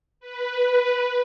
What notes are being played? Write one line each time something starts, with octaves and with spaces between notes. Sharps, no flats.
B4